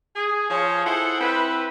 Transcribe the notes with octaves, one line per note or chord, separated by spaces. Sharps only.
G#4
F3 F4 G#4 C#5
E4 G#4 A4 C5 F#5
C4 E4 B4